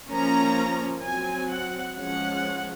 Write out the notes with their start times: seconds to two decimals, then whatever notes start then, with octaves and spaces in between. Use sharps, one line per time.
0.11 F3 A#3 C#4 A#5
1.04 F#3 C4 G#5
1.49 F#5
1.95 F3 G#3 C#4 F#5